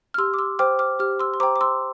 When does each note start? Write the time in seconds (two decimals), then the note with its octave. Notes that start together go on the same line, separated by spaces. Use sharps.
0.14 F6
0.18 G4 C6 E6
0.34 D6
0.39 C6 E6
0.59 C5 G5 D6 F6
0.79 D6 F6
0.99 G4 D6 F6
1.20 C6 E6
1.34 C6
1.40 C5 G5 A#5 D6
1.56 D6
1.61 C6 E6